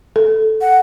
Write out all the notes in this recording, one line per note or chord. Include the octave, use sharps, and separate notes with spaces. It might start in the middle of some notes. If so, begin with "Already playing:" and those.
A4
F#5